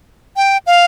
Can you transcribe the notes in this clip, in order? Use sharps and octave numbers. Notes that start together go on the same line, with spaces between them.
G5
F5